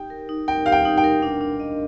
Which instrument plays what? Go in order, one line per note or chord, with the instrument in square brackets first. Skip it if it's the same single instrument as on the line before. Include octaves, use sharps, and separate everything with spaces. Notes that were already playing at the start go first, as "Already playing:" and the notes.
Already playing: [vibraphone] D#4 G4 [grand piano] G5
[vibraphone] A#4
D#4
[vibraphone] A#4 [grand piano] G5
[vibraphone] G4 [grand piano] F5
[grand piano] G5
[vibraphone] D#4
[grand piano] G5
[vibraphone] A#4
D4
D4
D#5